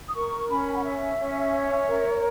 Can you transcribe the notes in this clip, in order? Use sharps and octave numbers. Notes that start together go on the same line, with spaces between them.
D#6
A#4 C#6
C#4 B5
G#5
F#5
C#5 E5
C#4
C#5
A#4